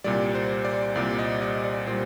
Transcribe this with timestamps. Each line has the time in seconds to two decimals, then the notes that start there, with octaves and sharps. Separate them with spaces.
0.04 C2 A#2 G3 D5
0.35 C5
0.65 D5
0.95 C2 A#2 G3 D5
1.19 D#5
1.42 D#5
1.64 D5
1.87 A#2 G3 C5